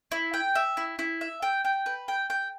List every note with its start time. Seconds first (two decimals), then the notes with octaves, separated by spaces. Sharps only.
0.12 E4
0.34 G5
0.55 E5
0.77 E4
0.99 E4
1.21 E5
1.42 G5
1.65 G5
1.86 B4
2.08 G5
2.30 G5